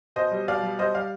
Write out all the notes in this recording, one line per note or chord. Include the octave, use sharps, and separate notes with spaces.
B2 C5 D#5
G3
B2 D5 F5
G3
G3 C5 D#5
G3 D5 F5